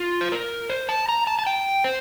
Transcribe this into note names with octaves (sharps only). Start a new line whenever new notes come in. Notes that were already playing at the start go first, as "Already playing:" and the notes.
Already playing: F4
C5
A#4
C5
A5
A#5
A5
A5
G5
C5